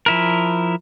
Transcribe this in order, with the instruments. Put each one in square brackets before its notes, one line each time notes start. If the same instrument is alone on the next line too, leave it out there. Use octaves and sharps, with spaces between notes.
[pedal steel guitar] F3 E4 A#4